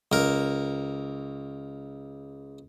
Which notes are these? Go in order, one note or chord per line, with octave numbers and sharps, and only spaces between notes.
C#2 A#4